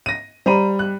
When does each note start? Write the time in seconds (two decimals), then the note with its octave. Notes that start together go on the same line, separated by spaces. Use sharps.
0.06 A#6 D#7
0.46 G3 C5 A#5 B5 D#7
0.79 F#6